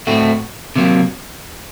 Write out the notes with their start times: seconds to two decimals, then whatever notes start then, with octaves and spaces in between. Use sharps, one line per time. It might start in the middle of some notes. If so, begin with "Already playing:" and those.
0.07 A2 A3 C4 F#4
0.76 C3 F#3 A#3